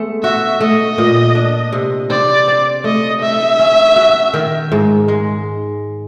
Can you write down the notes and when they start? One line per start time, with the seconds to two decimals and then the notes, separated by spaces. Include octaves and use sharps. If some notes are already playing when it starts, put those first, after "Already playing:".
Already playing: G#3 A3 B3
0.23 F#4 E5
0.61 A3 D#5
0.98 A#2
1.35 D4
1.73 C3
2.10 C4 D5
2.47 C4
2.84 A3 D#5
3.21 A3 E5
3.59 C#4
3.96 F#4
4.34 D#3
4.72 G#2
5.08 G#3